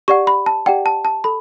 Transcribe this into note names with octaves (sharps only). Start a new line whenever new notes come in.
G4 D5 F#5 C#6
B5
A5
G4 D5 F#5 G5
A5
A5
A4 B5